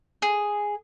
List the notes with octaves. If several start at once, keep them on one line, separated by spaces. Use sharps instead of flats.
G#4